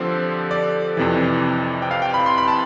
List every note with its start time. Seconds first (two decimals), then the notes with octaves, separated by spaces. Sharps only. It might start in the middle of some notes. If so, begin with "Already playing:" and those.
Already playing: D3 F3 C4 G4 A4 C5
0.51 D5
0.97 F2 C3 E3
1.82 G5
1.91 F5
2.02 G5
2.14 B5
2.26 C6
2.38 B5
2.48 A5